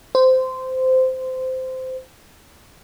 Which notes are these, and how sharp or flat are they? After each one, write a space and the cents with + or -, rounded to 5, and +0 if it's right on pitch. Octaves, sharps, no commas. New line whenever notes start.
C5 -15